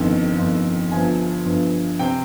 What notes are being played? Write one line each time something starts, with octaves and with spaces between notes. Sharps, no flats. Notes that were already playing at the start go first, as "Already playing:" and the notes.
Already playing: G1 F2 D#3 G5
G1 F2 D#3
G1 G2 F3 G#5
G1 G2 F3
C3 G5